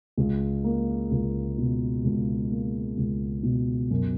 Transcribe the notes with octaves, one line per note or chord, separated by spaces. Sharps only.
C#2
A#3
C#2
B2
C#2
A#3
C#2
B2
F#2